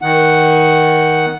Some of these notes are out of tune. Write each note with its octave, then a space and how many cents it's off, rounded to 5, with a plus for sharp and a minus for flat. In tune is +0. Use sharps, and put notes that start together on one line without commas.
D#3 +15 F#5 +0